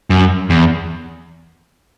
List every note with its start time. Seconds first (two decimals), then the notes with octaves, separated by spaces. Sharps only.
0.10 F#2
0.50 E2